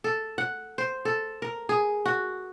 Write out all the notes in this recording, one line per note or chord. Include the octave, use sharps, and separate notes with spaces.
A4
F#5
C5
A4
A#4
G#4
F#4